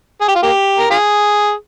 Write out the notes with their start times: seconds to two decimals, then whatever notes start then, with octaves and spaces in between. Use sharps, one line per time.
0.21 G#4
0.28 G4
0.36 F4
0.43 A#3 G4
0.79 A#4
0.91 F4 G#4